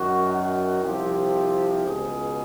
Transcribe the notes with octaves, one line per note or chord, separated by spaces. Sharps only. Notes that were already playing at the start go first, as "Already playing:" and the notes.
Already playing: F#2 D#3 F#4
F#4
C2 C3 F3 G4
C#2 B2 G#4